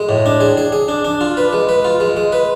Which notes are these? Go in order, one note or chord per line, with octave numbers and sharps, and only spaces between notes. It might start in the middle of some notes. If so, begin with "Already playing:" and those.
Already playing: G#3
A2
D4
G#4
G#4
G#4
D4
D4
F4
B4
G#3
B4
F4
G#3
G#3
B4